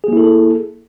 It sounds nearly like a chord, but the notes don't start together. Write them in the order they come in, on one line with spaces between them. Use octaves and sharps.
G#4 A#3 E4 A4